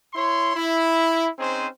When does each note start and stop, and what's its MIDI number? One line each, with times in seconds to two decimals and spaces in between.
0.14 0.55 64
0.14 0.55 73
0.14 0.55 84
0.56 1.28 64
1.39 1.67 60
1.39 1.67 61
1.39 1.67 63
1.39 1.67 68
1.39 1.67 72